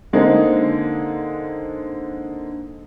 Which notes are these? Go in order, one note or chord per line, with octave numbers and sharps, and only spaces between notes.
D3 G#3 A#3 C4 D#4 G#4